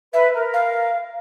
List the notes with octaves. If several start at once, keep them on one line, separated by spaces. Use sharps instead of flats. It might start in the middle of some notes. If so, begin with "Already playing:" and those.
B4 E5
A#4
F5